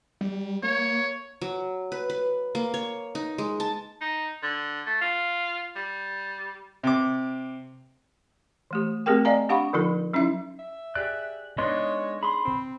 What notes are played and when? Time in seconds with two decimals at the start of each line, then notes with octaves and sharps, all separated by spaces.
0.21 G3
0.63 A#3 C#5
1.42 F#3
1.92 B4
2.10 B4
2.55 A#3
2.74 C#5
3.15 D#4
3.38 G#3
3.60 A5
4.01 D#4
4.43 D3
4.86 A3
5.01 F4
5.76 G3
6.83 C3 D6
8.71 E3 A3 G4
9.06 A3 C4 G4 G#4 A#4 G5
9.25 D5 D#5 F5 G#5 A#5
9.49 D4 G4 F5 F#5 B5 C#6
9.73 D3 F3 D#4 F4 A4
10.14 F#3 C#4 D#4 E4 E5
10.59 E5
10.95 G4 G#4 D5 F#6
11.58 G#3 B3 D4 D#4 C#5 D#5 C6
12.23 G#4 B5 C6
12.45 C4